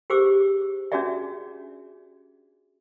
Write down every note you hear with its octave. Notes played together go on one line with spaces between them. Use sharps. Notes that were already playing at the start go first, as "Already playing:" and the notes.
G4 G#4 C5 D6 E6
C#4 D4 F#4 G#4 D5 E5